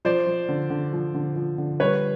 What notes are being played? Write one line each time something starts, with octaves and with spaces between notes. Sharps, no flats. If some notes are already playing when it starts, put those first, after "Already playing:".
F3 C5 D5
F3
D3
D3
F3
D3
F3
D3
G3 B4 C#5